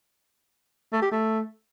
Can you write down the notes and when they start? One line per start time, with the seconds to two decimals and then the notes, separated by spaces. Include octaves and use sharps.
0.93 A3
1.02 G4
1.12 A3